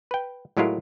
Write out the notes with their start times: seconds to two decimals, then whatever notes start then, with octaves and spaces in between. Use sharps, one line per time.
0.11 B4 G5
0.57 A2 F#3 G#3 E4 F4 A#4